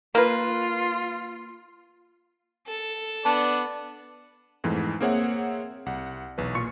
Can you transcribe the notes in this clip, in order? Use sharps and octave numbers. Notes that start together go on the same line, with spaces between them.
A#3 F4 B4
A4
B3 D4 A5
F2 G#2 E3 A3
A#3 C4 G#4 C#5 E5 F#5
C2 F#5
B1 E2 B4
A#2 F4 C#6 C#7